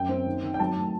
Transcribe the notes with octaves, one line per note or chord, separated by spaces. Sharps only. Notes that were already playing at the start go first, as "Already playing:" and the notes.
Already playing: F#2 G5
C4
D#2
D#3
G5
F#3 A5
A2